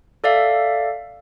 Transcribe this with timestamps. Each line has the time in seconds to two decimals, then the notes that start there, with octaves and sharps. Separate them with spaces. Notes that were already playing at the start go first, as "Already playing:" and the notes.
0.24 A4 D5 E5 F5